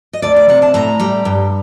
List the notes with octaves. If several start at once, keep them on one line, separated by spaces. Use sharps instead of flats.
D#5
D2 D5
D5
C3 F#5
A5
A2 A#5
G3
G2